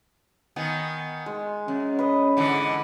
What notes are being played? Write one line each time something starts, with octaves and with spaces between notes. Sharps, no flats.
D#3 B3 G#5
G#3
F#2 C#4
B4 D#5
G#2 D3 E3